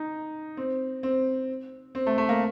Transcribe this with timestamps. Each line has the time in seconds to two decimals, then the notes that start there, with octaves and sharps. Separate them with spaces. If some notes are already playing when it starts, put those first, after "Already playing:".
Already playing: D#4
0.57 C4
1.03 C4
1.95 C4
2.06 A3
2.18 A3
2.29 A#3